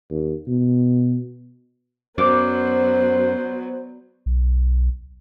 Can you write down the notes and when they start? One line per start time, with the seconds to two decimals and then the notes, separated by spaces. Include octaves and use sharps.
0.10 D#2
0.47 B2
2.18 F#2 F#3 B3 C5 D5 D6
4.26 B1